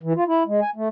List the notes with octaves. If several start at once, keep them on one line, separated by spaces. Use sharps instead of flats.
E3
F4
E4
G#3
G#5
A3